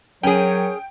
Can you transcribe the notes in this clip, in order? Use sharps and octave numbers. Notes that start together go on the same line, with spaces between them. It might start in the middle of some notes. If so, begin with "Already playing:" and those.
F#3 C#4 G#4 A#4 C#5 G5